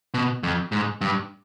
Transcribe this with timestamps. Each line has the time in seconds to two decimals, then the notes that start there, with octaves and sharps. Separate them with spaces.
0.14 B2
0.43 F2
0.72 G#2
1.01 G2